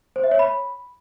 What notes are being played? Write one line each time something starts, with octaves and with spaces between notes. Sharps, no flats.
C5
E5
C#5
B5